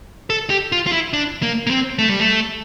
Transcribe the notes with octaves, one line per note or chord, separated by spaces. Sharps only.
A4
G4
F4
F4
E4
D4
A#3
A#3
C4
A3
G3
A3